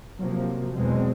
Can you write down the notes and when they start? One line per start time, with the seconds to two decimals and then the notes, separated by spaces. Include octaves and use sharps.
0.18 C3 F3 F#3 A#3
0.74 E2 B2 G#3 C4